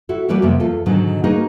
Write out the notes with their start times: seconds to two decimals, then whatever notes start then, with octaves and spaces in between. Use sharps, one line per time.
0.09 E4 F#4 A4
0.28 E3 G3 A#3 F#4 B4 D5
0.42 F2 C3 A#3 B3
0.60 E2 F4 A4
0.86 G#2 B2 D3 D#3 F#3
1.24 A#3 D#4 F#4 G#4 B4